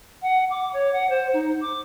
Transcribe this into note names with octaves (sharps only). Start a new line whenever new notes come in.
F#5
D6
C#5
F#5
C5
D#4
D6